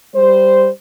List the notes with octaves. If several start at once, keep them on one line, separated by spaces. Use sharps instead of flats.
G3 C5